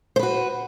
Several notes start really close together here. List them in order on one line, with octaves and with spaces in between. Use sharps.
C5 B4 F#4